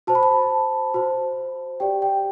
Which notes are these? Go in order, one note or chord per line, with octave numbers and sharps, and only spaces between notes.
F#4 C5 A5
B5
A5
F#4 C5
G4 D5 G5
G5